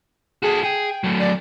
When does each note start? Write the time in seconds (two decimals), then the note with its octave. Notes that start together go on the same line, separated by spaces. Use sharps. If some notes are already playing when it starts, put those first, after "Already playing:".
0.43 F#4 G#4 A4
0.64 G#4 G5
1.04 F#3 A3
1.20 D5